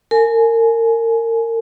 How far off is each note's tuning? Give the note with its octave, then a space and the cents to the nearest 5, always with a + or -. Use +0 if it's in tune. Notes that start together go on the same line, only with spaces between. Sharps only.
A#4 -30 G#5 +25